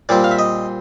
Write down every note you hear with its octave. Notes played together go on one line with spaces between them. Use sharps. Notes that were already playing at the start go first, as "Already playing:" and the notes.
A#2 G3 C4 D5
F5
E5
D#5